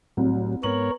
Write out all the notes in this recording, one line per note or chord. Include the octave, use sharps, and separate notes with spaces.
C2 A2 F#3
G#2 B3 A#4 C#5 F#7